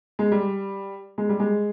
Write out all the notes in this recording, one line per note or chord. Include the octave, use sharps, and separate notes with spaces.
G#3
G3
G#3
G3
G#3